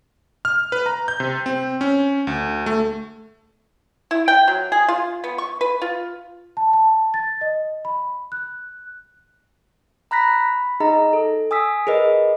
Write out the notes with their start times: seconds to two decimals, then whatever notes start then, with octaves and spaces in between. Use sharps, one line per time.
0.45 F6
0.72 B4
0.86 A#5
1.08 G6
1.20 C3
1.46 C4
1.81 C#4
2.27 D2
2.66 A3
4.11 E4
4.28 G5
4.48 F#3
4.72 G#4
4.88 F4
5.24 B3
5.38 C#6
5.61 B4
5.82 F4
6.57 A5
6.73 A5
7.14 A6
7.41 D#5
7.85 B5
8.32 F#6
10.11 A#5 B5 F#6 A#6 B6
10.28 B5
10.80 D#4 G#4 D#5 A#5
11.13 A4
11.51 G#5 D#6 E6 B6
11.87 G#4 A#4 B4 D#5